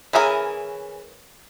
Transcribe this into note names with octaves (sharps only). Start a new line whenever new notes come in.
E3 C#4 E4 G#4 A#4